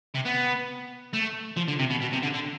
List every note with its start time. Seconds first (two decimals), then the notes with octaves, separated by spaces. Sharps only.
0.14 C3
0.25 B3
1.13 A3
1.57 F3
1.68 D3
1.79 C3
1.90 B2
2.01 B2
2.12 C3
2.22 D3
2.34 D3